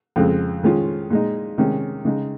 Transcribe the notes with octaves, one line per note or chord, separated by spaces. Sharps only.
F2 C#3 G#3
D#3 G#3 C#4 F4
A#2 G#3 D#4
C3 D#3 G#3 C#4
C#3 G#3 D#4